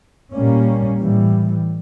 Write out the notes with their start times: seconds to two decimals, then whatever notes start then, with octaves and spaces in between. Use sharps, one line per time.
0.33 A#2 G3 A#3 C#4
0.99 A2 E3 G3